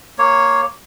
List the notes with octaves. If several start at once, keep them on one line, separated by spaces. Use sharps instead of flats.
A#3 C#5